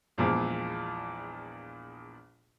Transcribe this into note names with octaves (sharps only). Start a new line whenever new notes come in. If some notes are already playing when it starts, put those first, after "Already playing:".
A#1 E2 A#2 E3 F3 G#3